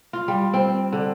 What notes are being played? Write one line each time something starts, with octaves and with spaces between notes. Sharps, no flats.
F4
G3
C4
D3